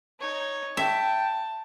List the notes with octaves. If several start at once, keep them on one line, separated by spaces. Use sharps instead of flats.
D#4 C#5
E5 G5 A5